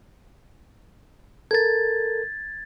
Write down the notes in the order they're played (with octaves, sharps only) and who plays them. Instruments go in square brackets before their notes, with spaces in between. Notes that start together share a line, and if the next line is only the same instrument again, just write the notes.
[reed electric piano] A4 A#4 [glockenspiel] G#6 A6